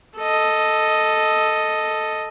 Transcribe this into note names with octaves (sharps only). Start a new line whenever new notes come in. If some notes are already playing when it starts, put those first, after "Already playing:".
A4 D#5